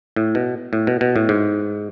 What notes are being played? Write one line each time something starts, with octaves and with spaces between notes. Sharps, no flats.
A2
B2
A2
B2
B2
A2
G#2